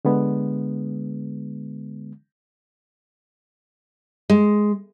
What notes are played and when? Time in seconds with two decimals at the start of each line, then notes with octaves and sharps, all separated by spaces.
0.05 D3 G#3 B3
4.30 G#3